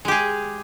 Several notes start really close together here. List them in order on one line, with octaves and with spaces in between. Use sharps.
G#3 G4 G#4